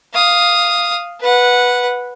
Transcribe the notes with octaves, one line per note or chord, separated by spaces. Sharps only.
F5 D#6
B4 F#5